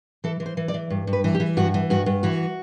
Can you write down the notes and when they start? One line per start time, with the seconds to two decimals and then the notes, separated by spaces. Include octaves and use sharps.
0.24 E3 A4
0.40 E3
0.46 C5
0.57 E3
0.68 D5
0.74 E3
0.90 G2
1.07 G2
1.13 B4
1.24 E3
1.35 G4
1.40 E3
1.57 G2 F#4
1.74 E3
1.90 G2 F#4
2.06 G2
2.23 E3 F#4